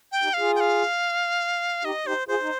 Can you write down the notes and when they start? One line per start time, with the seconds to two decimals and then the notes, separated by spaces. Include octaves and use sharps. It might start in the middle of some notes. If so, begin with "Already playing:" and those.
0.12 G5
0.23 D#4 G4
0.34 F5
0.39 F4 G#4
0.56 G5
0.60 F5
1.84 D#4 G4 D#5
2.06 D#4 G4 C5
2.28 F4 G#4 C5
2.42 D#4